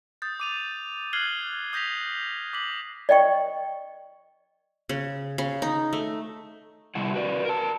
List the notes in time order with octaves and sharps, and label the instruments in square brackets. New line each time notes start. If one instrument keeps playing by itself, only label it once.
[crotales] D#6 G6 A6
D6 D#7 F7
F6 F#6 G#6 C7 F#7 G7
D#6 G6 A#6 B6 F7
D6 B6 F#7
[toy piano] D5 D#5 G5 C#6
[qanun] C#3
C#3
D#4
A3
[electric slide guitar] C3 G3 E4 F#5
F#4 B4 D5
A#4 A5